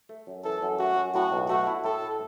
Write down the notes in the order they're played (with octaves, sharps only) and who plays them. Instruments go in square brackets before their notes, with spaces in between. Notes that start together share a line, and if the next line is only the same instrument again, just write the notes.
[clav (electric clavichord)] A3
F#2
[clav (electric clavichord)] E3 [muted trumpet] A4
[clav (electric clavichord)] F#2
[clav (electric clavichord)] A3 [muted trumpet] F#4
[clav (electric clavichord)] F#2
[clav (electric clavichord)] A2 [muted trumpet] F#4
[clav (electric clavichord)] B1
[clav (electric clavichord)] A3 [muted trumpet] F#4
[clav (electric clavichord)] E4
[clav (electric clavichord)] A2 [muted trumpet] A4